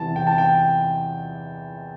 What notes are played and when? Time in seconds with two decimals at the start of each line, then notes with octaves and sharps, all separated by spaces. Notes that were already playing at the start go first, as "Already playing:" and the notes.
Already playing: E2 C3 E3 A5
0.16 G5
0.27 A5
0.38 G5